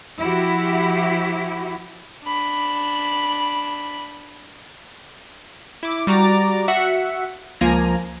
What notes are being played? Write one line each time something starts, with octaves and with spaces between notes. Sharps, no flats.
F3 E4 F#4 G4
D4 B5
E4 D6
G3 F#4 A#5 D6 A6
F#4 E5 F#5
C#2 F3 A#3 G#5 A#5